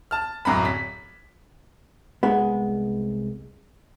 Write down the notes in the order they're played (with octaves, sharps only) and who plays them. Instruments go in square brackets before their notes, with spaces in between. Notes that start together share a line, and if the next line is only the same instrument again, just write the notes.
[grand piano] A5 F6
D1 F#2 A#5 B5
B6
[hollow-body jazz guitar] C2 G#3 B3